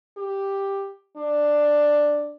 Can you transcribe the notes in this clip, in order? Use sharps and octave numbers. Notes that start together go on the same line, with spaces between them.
G4
D4